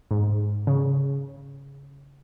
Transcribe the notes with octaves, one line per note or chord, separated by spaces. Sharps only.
G#2
C#3